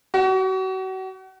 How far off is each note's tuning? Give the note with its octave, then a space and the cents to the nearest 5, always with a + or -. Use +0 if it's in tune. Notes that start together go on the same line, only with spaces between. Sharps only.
F#4 +35